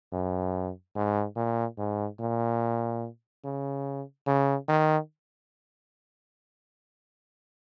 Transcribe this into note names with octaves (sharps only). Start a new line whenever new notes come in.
F#2
G#2
A#2
G#2
A#2
C#3
C#3
D#3